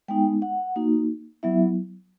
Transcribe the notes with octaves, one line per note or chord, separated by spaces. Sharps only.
G#3 B3 D#4 G5
F#5
A#3 D#4 F#4
F#3 B3 E4 E5